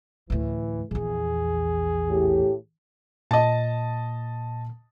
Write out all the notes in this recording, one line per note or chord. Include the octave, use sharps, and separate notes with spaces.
D2 A2 E3
A#1 E2 G#4
A2 G4
A#2 D#5 A5